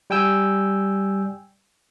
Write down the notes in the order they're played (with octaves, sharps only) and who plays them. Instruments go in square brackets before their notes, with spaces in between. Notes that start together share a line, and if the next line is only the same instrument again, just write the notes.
[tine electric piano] G3 G5 G#5 E6 G6